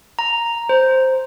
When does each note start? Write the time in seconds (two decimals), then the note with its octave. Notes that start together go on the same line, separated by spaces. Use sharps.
0.19 A#5
0.69 C5